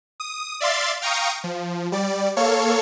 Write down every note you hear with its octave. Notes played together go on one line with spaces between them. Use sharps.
D#6
D5 E5 F5 C6 A6
F5 G5 A#5 C#6 D#6
F3
G3 D5
A#3 A4 C#5 F5 C#6